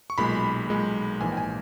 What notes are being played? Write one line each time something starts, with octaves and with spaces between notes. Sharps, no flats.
C#6
B1 A#2 G#3 B5
B1 A#2 G#3
A#1 G#2 E3 A#3 G#5
G5
G#5